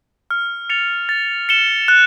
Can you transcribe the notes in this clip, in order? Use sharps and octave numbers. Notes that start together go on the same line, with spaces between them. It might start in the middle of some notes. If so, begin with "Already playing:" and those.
F6
A6 C#7 F7
A6
C#7 E7 G7
F#6